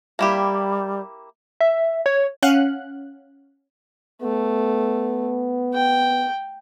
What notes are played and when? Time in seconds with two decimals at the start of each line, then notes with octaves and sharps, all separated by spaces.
0.19 G3 A#3 E4 G4
1.61 E5
2.06 C#5
2.42 C#4 F5 F#5 F#6
4.22 A3 B3
5.74 G5